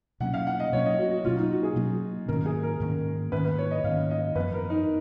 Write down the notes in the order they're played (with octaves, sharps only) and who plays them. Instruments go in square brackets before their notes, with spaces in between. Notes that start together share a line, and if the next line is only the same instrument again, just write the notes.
[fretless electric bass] B2 F#3 A#3 C#4 [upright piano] F#5
[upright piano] F5
F#5
D#5
[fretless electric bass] B2 F#3 A#3 C#4 [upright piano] C#5
[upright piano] D#5
F#4
F#4
[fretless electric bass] B2 F#3 A#3 C#4 [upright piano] F4
[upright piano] D#4
F#4
G#4
[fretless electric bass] B2 F#3 A#3 C#4
[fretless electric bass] G#2 D#3 A#3 C#4 [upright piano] A#4
[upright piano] G#4
A#4
[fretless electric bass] G#2 D#3 A#3 C#4
[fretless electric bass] G#2 D#3 A#3 C#4 [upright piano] B4
[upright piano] B4
C#5
D#5
[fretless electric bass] G#2 D#3 A#3 C#4 [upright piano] F5
[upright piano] D#5
[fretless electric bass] F#2 F3 B3 [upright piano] B4
[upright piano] A#4
D#4